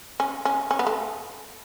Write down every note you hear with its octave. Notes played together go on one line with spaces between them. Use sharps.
C#4
C#4
C#4
B3
A3